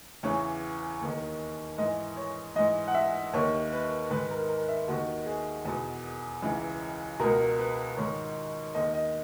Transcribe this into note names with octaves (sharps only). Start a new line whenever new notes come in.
E2 C#3 E3 C#5
D#2 D#3
G#2 E3 D#5
C#5
G#2 E3 D#5
F#5
E5
D#2 D#3 C#5
B4
G#2 D#3 B4
A#4
A#4
E5
D#2 D#3 F#4
G#4
E2 B2
C#2 C#3 E3
C#2 B2 A#4
B4
G#2 D#3 C#5
D#2 D#3 D#5
D#5